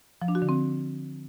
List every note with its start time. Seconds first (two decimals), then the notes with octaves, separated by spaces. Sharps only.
0.21 F3
0.28 D4
0.35 F#4
0.42 D3
0.49 C4